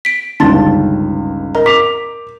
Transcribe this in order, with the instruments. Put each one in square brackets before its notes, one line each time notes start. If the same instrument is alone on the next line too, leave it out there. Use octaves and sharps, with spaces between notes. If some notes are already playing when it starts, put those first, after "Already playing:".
[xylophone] B6 D7
[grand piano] G1 C#2 D#3 [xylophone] A5 C6 A6
[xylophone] A#4 D#5 A#5
[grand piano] D6 F7 [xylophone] B6